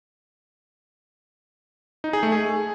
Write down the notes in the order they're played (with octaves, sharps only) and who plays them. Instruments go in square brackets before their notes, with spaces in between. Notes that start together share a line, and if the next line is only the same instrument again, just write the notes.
[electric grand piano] D#4
G#4
A3
G#4